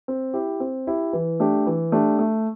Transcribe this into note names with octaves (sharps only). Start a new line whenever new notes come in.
C4
E4 G4
C4
E4 G4
E3
A3 D4 G4
E3
A3 D4 G4
A3